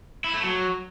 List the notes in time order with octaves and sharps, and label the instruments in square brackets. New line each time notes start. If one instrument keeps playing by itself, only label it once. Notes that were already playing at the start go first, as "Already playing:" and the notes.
[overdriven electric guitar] E4
A3
F#3